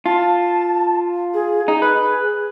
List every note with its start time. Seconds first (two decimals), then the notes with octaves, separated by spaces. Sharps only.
0.06 F4 A5
1.34 G#4
1.68 D#4 G#4
1.82 B4